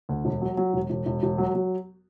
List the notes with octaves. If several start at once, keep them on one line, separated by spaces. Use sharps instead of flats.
D2
E1
F#3
F#3
E1
E1
E1
E1
F#3
F#3